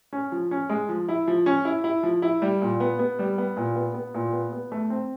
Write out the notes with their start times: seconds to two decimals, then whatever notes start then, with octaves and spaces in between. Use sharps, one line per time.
0.13 C#4
0.32 F3
0.51 C#4
0.70 G#3
0.89 F3
1.09 E4
1.27 F3
1.46 C#4
1.65 E4
1.84 E4
2.03 F3
2.22 E4
2.42 G3
2.62 A#2
2.80 B3
2.99 B3
3.19 G3
3.38 B3
3.57 A#2
3.76 B3
3.94 B3
4.14 A#2
4.33 B3
4.52 B3
4.72 A3
4.90 C4